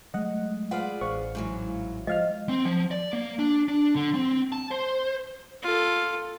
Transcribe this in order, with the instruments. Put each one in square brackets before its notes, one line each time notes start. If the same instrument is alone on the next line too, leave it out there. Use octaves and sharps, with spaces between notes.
[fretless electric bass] F#3 G#3 A3 [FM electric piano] D#5 F#5
[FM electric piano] F4 F5 [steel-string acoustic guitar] G#4 B4 D5 [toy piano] F#5
[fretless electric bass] A1 [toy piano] C5 [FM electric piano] F5 C#6
[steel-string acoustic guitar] G#2 E3 F#3
[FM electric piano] F3 F5 F6 [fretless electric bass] G#3 [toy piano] D#5
[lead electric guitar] C4
F3
D5
A#3
D4
D4
D3
C4
A5
C5
[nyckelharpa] F4 A4